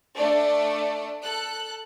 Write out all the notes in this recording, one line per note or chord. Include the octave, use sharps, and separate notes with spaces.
A3 D4 D5
A4 F#6